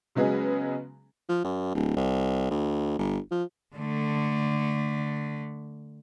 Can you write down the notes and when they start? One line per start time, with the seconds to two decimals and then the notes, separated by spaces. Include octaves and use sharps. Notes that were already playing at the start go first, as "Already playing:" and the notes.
0.15 C#3 F#3 G#3 B3 G#4
1.29 F3
1.44 F#2
1.74 D1
1.96 C2
2.51 D2
2.99 G1
3.31 F3
3.76 D3 A3